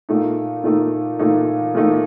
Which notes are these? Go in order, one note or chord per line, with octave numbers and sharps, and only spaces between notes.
A#2 A3 D#4
A#2 A3 D#4
A#2 A3 D#4
A#2 A3 D#4